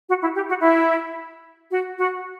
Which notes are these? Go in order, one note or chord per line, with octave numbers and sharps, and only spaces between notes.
F#4
E4
G4
F#4
E4
F#4
F#4